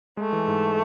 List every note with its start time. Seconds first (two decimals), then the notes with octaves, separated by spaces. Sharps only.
0.17 G#3 A3
0.33 E3
0.48 G#2